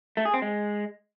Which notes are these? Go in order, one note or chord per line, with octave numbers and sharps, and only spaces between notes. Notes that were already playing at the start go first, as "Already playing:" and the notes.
A3
G#4
C4
G#3